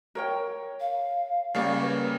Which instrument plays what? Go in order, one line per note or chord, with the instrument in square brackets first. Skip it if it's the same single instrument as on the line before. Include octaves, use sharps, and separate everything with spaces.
[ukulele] A#4 C#5 G5
[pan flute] F5
[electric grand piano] C#3 G3 A#3 [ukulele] D5 F5 G#5 [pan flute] C#6
[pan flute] B4 [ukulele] C#5